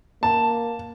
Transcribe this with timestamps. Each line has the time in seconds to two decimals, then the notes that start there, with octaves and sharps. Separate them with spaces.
0.23 A#3 A5